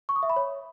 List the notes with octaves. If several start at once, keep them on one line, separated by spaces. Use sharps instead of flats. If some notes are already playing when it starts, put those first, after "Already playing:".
C#6
D#6
E5
B5
C#5